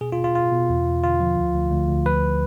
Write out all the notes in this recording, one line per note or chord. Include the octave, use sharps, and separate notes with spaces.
B2 G#4
F4
B2
F4
B2 F4
B2
E2
E2
D3 F4
F3
D2
D2
D2
D2
F3 B4